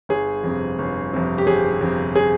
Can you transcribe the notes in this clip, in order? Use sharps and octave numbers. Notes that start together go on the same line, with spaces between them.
G1 G#4
F2 C3
G1
F2 C3
G4
G1 G#4
F2 C3
G#4